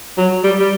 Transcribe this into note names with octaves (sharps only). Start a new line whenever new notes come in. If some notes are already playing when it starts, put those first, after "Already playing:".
F#3
G3
G3